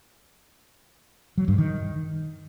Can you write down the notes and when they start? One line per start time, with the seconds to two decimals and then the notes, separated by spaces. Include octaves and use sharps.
1.38 F#3
1.48 G2
1.58 D#3